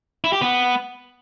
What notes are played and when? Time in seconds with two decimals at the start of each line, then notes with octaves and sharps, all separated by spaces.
0.24 E4
0.33 G4
0.41 B3